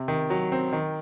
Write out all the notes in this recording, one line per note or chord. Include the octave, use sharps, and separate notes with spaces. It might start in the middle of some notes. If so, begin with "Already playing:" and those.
Already playing: C3
D#3
F#3
C4
D#3